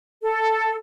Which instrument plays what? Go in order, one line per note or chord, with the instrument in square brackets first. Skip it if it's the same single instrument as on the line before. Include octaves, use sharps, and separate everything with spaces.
[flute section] A4